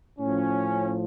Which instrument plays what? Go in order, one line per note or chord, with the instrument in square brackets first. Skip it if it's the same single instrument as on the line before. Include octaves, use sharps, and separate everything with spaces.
[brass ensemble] A2 F3 C#4